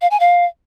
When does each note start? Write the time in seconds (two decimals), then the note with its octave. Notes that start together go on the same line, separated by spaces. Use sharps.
0.01 F5
0.11 G#5
0.20 F5